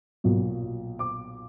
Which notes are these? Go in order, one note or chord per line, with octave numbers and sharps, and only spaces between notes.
B1 A#2 F#3
D6